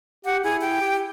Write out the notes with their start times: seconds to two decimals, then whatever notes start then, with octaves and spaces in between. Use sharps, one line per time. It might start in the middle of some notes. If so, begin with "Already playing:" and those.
0.25 G4 F#5
0.44 E4 G#4
0.61 G5
0.80 G4